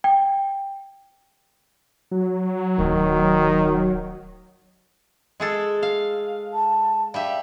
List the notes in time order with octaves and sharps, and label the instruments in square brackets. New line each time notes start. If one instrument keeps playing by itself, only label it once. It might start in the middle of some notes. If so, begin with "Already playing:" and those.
[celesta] G5
[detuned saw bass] F#3
[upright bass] D1 [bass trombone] D#3
[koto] G#3 G#4 A4
F5
[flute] A5
[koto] G3 G4 E5 [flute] F5